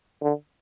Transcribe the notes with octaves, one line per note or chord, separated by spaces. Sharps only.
D3